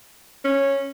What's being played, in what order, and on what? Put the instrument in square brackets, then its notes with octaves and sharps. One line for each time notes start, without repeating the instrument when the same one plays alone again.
[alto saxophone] C#4